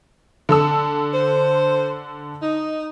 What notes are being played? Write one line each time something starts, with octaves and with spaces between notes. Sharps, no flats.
D3 A4 E6
C5
D#4